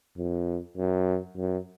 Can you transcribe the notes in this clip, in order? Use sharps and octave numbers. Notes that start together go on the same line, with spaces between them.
F2
F#2
F#2